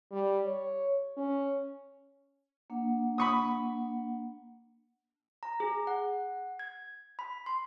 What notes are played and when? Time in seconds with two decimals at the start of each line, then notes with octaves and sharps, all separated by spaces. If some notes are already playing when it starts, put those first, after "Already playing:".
0.12 G3
0.46 C#5
1.17 C#4
2.70 A#3 D4 F#5
3.18 B5 C#6 D#6
5.43 A#5
5.60 G#4
5.87 F#5
6.59 G#6
7.19 B5
7.46 C6